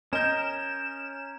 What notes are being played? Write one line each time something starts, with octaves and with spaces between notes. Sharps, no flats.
C#4 A#4 D#5 G6 E7